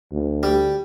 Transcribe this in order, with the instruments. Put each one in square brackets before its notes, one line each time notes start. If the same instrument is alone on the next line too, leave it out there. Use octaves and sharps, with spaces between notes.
[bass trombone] D2
[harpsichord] G3